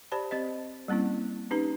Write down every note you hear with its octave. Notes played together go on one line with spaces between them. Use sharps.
G4 C5 D5 A5 B5
C4 G4 C5 D#5
G3 A#3 C4 C#4 E4
C#4 D#4 G4 B4 A#5